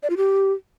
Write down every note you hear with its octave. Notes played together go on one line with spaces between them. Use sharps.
D5
F4
G4